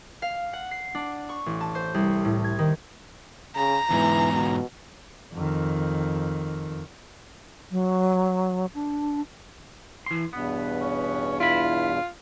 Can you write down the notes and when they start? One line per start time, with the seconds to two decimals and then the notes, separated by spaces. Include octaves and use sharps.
0.22 F5
0.53 F#5
0.71 C7
0.95 D4
1.29 C#6
1.46 A1
1.61 A5
1.75 C5
1.94 C2
2.25 A2
2.44 G#6
2.59 D#3
3.56 C#3 A#5
3.90 E2 G#2 E3
4.32 B2
5.33 F2 D#3
7.71 F#3
8.74 D4
10.06 E3 C6
10.33 E2 G2 B2 B3
10.81 C#4
11.40 E4 F4 B5